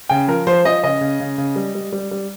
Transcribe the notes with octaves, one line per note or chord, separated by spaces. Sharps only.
C#3 G5
F3 A#4
F3 C5
F3 D#5
C#3 D#5
C#3
C#3
C#3
G3
G3
G3
G3